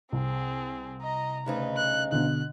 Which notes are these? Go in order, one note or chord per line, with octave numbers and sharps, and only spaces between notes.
C2 C4 G#4
D#5 A#5
D2 C#3 D#4 B4
F#6
B2 D3 F#6